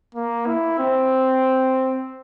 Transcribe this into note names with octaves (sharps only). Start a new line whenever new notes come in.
A#3
E4
C4